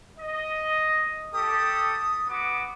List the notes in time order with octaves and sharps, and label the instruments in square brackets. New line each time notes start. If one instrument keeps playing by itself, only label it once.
[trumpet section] D#5
[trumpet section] G4 A4 [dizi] D#6
[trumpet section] B3 F#4 D6